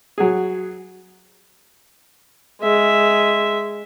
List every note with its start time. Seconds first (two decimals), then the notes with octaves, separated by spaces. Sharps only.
0.18 F#3 G#4
2.62 G#3 E5